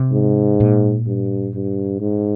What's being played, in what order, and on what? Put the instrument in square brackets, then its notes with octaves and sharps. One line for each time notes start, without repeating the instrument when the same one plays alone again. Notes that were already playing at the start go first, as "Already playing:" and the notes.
Already playing: [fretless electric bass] C3
[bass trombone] G#2
[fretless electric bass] A#2
[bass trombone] G2
G2
G#2